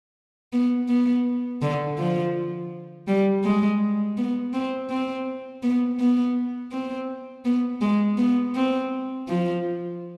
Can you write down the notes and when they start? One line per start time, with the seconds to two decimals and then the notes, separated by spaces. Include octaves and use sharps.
0.53 B3
0.89 B3
1.62 D3
1.98 F3
3.08 G3
3.44 G#3
4.17 B3
4.53 C4
4.90 C4
5.63 B3
6.00 B3
6.72 C4
7.45 B3
7.81 G#3
8.18 B3
8.55 C4
9.28 F3